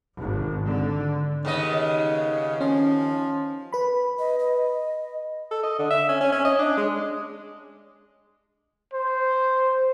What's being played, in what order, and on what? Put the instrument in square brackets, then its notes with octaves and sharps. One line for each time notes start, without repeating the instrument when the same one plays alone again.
[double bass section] G#1
D3
[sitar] D#2 B3 D#5 [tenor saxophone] C#3
[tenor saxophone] F3 [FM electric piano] C#4
[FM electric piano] B4 B5
[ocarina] D#5
D#5
[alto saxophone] A4
D#5
D3
E5
C#4
C#4
C#4
D#5
D4
G#3
[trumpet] C5